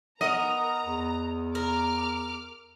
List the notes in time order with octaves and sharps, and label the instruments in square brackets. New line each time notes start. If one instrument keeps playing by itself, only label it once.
[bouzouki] B3 [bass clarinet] A#4 [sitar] D#5 [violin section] A#5
[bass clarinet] E2
[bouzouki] A#4 [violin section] D6 F6